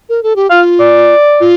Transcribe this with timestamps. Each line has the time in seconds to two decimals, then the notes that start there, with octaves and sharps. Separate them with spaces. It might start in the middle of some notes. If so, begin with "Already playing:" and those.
0.09 A#4
0.23 A4
0.36 G4
0.50 F4 F5
0.80 D5
1.40 F4